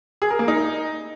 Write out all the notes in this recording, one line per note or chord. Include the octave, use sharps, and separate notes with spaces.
G#4
A#4
A#3
D#4